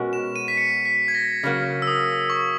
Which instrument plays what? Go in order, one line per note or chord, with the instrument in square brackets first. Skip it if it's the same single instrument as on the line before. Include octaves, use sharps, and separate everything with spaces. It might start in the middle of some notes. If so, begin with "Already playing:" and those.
Already playing: [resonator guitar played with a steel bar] B2 G#3 C#4 F#4 A#4
[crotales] E7
D#7
B6
C#7
B6
G#6
A#6
[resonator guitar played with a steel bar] C#3 F#3 A#3
[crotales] E6
D#6
C#6